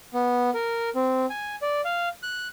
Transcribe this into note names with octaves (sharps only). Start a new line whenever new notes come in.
B3
A#4
C4
G#5
D5
F5
F#6